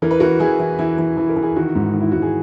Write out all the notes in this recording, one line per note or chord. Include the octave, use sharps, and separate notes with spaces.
E3 A#4
B4
E3 F#4 A#4
E3 E4 G#4
E3
E3 E4
E3
E3
A#4
E3
G#4
D#3 F#4
G#2
D#3
E4
G#2 F#4
G#4